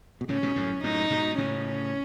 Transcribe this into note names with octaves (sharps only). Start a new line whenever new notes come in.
B2
A2 C#3 C#4
G#2 B2
F#2 A2
F#2 A2 D#4
G#2 B2
A2 C#3 C#4